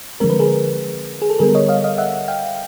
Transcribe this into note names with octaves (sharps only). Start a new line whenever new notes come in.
D3 F3 G#3 C4 A#4
B4
G#4 A#4
G#4
A4
D3 G3 B3 G#4 A#4
C#5 D#5
D#5 F5
D#5 F5
E5 F#5
F5 G5